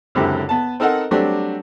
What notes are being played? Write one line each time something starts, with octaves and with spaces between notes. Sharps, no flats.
C#2 F#2 D3 C4 E4 G4
B3 A5
C4 D#4 A4 A#4 C5 F#5
F#3 G3 A3 C4 D4 G4